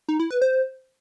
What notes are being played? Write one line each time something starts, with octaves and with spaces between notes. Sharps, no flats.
D#4
E4
B4
C5